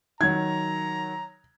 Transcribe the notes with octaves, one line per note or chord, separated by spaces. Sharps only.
D#3 F#3 A#5 G#6